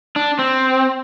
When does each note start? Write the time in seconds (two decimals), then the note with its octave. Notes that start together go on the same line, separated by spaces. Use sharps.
0.16 D4
0.39 C4